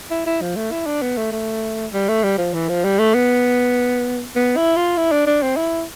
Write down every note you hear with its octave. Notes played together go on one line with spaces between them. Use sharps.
E4
E4
F3
A3
E4
D4
B3
A3
A3
G3
A3
G3
F3
E3
F3
G3
A3
B3
B3
E4
F4
E4
D4
D4
C4
E4